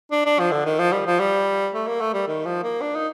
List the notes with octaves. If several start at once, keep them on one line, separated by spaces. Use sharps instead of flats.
D4
D4
F3
D3
D#3
F3
G3
F3
G3
A3
A#3
A3
G3
D#3
F3
A#3
D4
D#4